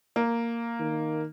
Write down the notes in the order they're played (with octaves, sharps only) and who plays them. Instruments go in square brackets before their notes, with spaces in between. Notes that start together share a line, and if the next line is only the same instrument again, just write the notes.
[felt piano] A#3
[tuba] D#3